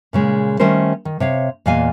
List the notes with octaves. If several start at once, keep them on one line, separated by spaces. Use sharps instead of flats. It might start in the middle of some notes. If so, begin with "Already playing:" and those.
A#2 C#3 G#3
D#3 G3 A3 C#4 A#4 C5
D#3
C3 C#5 F5
E2 A#2 D#5 F5 G#5